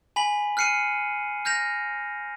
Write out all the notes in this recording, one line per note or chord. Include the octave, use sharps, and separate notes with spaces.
G#5 B5 B6 F#7
F6 F#6 C7 C#7 D#7
F6 G6 A#6 F7